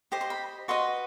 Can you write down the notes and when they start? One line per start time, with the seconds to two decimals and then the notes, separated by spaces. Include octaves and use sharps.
0.12 G4 C5 D#5
0.21 C6
0.30 B5
0.68 F#4 B4 D#5 C6